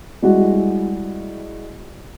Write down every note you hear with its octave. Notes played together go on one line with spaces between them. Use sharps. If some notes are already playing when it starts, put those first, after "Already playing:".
G3 G#3 E4 F#4